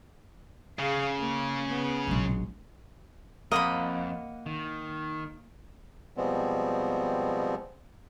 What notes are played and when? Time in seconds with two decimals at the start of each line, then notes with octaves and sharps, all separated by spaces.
0.79 C#3 G#4 F5
1.19 A#3
1.68 B3
2.07 E1 A#1 F#3 G#3
3.52 F2 A#3 D#5 F#5 B5
4.46 D#3
6.17 B2 F3 G3 G#3 B3 C4